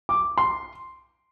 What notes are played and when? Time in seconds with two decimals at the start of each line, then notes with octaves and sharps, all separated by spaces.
0.09 D6
0.38 C6